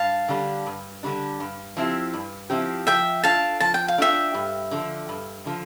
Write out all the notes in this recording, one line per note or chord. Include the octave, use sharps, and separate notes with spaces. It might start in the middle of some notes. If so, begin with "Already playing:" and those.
Already playing: G2 F5 A5
D3 G3 D4
G2
D3 G3 D4
G2
F3 C4 E4 G4
G2
F3 C4 E4 G4
F3 E5 G5
A3 D4 F4 F5 A5
F3 A5
G5
F5
A3 D4 F4 E5 G5
G2
D3 F3
G2
D3 F3